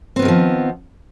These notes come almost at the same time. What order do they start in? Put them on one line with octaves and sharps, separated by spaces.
C4 B3 D#3 G#3 F3